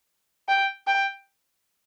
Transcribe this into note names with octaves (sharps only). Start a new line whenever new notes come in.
G5
G5